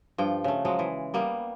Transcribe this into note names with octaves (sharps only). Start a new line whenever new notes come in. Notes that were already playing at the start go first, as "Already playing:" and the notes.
G2 F3 G5
C#3 A3
F3 F#3 G#3
E3
G3 A#3 B3